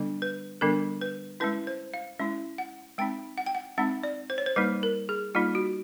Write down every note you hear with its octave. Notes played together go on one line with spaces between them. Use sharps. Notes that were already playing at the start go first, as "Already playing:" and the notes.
Already playing: D3 G3 B3 D4
B4
D3 G3 B3 D4 A#4
B4
G#3 C#4 E4 B4
C5
F5
G#3 C#4 E4
F#5
G#3 C4 D#4 G5
F#5
G5
F#5
G#3 C4 D#4 F#5
D5
C5
C#5
C5
G3 A#3 D#4 B4
A#4
G#4
G3 A#3 D#4 F4
F#4